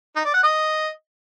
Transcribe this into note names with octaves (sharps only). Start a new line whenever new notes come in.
D#4
D5
F#5
D#5